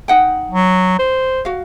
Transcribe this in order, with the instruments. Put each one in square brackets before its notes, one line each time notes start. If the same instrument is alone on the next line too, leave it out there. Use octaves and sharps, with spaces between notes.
[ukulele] D#4 F#5 G5
[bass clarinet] F#3
C5
[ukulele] F#4 F5